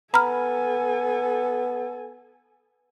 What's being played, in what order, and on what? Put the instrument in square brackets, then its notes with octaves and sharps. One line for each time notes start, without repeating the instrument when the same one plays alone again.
[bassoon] B3 [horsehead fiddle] A4 G#5 [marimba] A#5 B5 F6